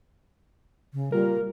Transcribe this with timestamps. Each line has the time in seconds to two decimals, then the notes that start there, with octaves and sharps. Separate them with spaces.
0.93 C#3
1.12 A#2 G3 A#4